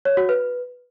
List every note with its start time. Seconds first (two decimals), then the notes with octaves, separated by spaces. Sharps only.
0.05 C#5
0.17 F#4
0.29 B4